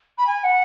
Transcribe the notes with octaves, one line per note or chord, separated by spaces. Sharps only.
B5
G#5
F#5